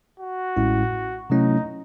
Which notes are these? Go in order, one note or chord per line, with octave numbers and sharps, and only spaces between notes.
F#4
A1 A2 G#3 C#4 E4
C3 F#3 A3 C#4 D#4 E4